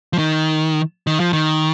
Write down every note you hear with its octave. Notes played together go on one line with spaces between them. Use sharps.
F3
D#3
D#3
F3
D#3